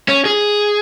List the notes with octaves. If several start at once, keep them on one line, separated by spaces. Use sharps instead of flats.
C#4
G#4